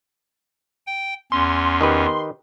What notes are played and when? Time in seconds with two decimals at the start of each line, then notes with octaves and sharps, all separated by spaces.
0.87 G5
1.32 E2 C#4 C6
1.81 D#3 G4 B4